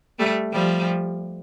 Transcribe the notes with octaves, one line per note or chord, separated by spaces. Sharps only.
G3 A3
F3 G3